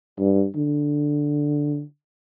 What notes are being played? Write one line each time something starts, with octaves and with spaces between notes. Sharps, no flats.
G2
D3